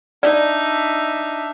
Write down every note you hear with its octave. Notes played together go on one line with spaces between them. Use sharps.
D4 D#4 D5 E5